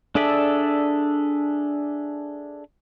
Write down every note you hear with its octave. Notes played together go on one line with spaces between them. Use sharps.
D4 G#4 A4 D5 E5